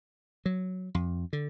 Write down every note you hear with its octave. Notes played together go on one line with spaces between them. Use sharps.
F#3
F2
D3